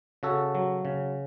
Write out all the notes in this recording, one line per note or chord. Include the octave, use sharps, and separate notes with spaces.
C#3 F#4 A4
F#3
C#3